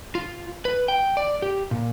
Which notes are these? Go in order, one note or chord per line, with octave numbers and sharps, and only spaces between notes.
F4
B4
G5
D5
G4
A#2